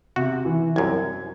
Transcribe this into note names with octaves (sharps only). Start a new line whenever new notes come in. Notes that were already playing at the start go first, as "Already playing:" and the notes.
C3 F#4
E3
C2 F#2 G#6